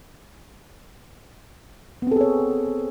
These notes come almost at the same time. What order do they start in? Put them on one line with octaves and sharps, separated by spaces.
B3 C4 A4 G#4 C#5